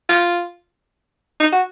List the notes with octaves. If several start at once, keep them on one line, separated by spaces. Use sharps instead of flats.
F4
D#4
F#4